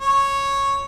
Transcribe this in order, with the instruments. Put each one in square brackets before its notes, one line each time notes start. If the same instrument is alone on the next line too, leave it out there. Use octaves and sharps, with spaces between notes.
[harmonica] C#5